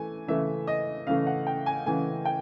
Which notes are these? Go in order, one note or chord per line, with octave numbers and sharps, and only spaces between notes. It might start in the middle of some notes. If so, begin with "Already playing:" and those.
Already playing: E3 A3 G#5
C#3 E3 A3 E5
D#5
C#3 E3 A3 F5
F#5
G5
G#5
C#3 E3 A3 G#5
G5